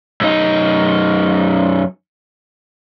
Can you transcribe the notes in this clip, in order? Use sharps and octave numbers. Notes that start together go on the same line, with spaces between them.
F#2 D#4